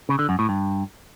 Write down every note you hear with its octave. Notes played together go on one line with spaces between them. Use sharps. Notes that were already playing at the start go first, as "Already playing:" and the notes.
C#3
D3
F#2
A2
G2